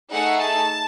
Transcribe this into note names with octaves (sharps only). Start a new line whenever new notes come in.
A3 D#4 G#4 F#5
A5